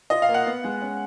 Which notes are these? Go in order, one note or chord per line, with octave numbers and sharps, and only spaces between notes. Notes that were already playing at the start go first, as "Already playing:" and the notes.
F4 D#5
F5
A#3
F#5
B3
G#3
C#4